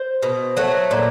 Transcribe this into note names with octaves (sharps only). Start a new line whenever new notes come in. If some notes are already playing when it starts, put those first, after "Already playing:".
Already playing: C5
B2
F#3 A3
A#2